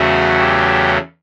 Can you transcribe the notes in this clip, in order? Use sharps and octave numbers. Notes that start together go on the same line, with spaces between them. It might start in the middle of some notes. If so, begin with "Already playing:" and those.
Already playing: E2 C#3 F#3 A3 C#4 F#4
G4